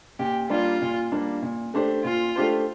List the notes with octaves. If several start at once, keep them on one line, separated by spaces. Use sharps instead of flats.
A#2 G4
G3 A#3 D4 F4
A#2
G3 A#3 D4
A#2
A3 D4 G4 C5
A#2 F4
A3 D4 G4 C5